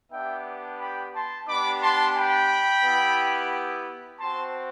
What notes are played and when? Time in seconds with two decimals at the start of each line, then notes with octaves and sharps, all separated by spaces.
0.12 B3 D4 G4 E5 G5
0.79 G5 B5
1.13 A5 C6
1.47 B3 D4 G4 B5 D6
1.81 A5 C6
2.15 G5 B5
2.83 B3 E4 G4
4.19 C4 F#4 A5 C6